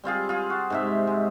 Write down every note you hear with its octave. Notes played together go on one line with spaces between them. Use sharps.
G3 C4 F4 G#4
F4 G#4
F#4
G#2 C3 E5
G#3